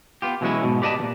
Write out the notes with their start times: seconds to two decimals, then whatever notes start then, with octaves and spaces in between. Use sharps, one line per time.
0.22 B3 F4 G4
0.41 B2 E3 F#3 G#3 C#4 E4
0.63 G#2 B2
0.82 G4 B4 D5 D#5 F5 A5
0.99 D#2 A#2